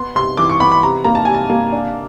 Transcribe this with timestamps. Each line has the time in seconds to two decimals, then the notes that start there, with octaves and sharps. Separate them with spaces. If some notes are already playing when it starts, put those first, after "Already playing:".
Already playing: B3 C6
0.15 C3 C6
0.37 E3 D6
0.49 C#6
0.60 B3 B5
0.72 B5
0.83 C3 A#5
1.04 A#3 A#5
1.15 A5
1.25 C3 G#5
1.34 A5
1.50 A#3
1.72 D4